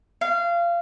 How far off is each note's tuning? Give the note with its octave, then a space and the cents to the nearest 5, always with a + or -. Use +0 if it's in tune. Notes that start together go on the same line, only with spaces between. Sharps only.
F5 -25